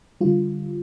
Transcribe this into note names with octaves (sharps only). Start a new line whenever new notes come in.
D3 G3 F4